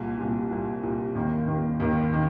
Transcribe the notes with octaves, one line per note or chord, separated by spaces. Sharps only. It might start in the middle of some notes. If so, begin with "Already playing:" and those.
Already playing: C2 A#2 G3
C2 A#2 G3
C2 A#2 G3
C2 A#2 G3
D#2 D#3 A#3
D#2 D#3 A#3
D#2 D#3 A#3
D#3